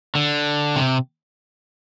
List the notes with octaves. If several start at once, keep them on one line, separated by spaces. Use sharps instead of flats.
D3
C3